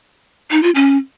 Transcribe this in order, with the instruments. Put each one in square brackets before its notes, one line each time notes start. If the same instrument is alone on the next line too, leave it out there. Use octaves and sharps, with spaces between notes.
[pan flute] D#4
F4
C#4